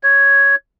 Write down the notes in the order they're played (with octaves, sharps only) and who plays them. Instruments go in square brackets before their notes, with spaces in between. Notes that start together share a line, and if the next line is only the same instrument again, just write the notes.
[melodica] C#5